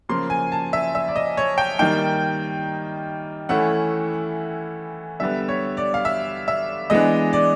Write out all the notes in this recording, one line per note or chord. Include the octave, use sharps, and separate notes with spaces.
C#3 F3 A#3 C6
G#5
A5
E5
E5
D5
D#5
C#5
G5
D#3 G3 A#3 D#4 G5
E3 A3 C#4 E4 F#5
D3 G3 B3 E5
C#5
D5
F5
E5
E5
E3 G#3 B3 D4 D#5
D5